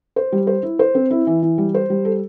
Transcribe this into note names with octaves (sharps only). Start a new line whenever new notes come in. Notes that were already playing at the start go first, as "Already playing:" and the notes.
C5
G3
C5
E4
C5
C4
E4
E3
E3
G3
C5
G3
A4